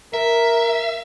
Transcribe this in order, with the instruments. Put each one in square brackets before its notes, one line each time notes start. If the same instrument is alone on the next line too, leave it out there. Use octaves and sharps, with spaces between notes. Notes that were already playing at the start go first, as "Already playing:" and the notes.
[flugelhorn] A#4 [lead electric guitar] E5